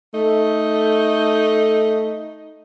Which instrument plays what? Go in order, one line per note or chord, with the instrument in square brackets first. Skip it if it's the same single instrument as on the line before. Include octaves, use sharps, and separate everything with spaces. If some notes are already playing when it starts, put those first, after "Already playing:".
[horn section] A3 [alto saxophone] D#4